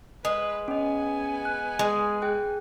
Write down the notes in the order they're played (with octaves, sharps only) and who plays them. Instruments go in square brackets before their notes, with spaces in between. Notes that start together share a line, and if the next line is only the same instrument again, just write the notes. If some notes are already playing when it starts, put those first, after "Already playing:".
[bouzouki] G#3 [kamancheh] B4
[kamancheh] B3 G#5 [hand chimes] C#4 D#5
[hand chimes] F#6
[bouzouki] G#3 [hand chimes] G#4
[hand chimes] G#4 G5 F#6